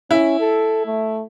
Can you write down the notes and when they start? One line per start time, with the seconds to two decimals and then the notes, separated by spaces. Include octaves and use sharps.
0.11 C#4 E4
0.40 A4
0.86 A3